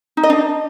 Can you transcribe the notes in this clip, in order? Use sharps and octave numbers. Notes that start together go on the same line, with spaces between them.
D#4
D#5
D4